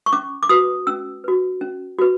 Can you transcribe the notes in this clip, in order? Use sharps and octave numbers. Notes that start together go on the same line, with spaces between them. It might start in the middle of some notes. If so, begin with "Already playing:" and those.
C#6
C#4 D6
D6
F#4 B4 D#6
C#4 E6
F#4 B4
C#4
F#4 B4